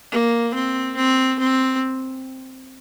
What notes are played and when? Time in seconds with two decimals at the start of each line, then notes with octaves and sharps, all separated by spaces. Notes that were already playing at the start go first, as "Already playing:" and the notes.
0.12 A#3
0.54 C4
0.97 C4
1.40 C4